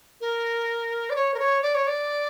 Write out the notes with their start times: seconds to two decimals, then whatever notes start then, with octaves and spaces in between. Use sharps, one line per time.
0.21 A#4
1.10 D5
1.16 C#5
1.34 A#4
1.39 C#5
1.63 D5
1.75 C#5
1.87 D5